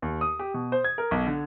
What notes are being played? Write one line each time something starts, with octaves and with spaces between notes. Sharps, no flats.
D#2
D#6
G4
B2
C5
G#6
A#4
B1
D3